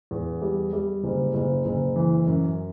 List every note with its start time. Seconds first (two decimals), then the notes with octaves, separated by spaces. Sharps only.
0.11 E2
0.42 G3
0.73 G3
1.04 F#1
1.34 F#1
1.66 F#1
1.96 E3
2.27 F#2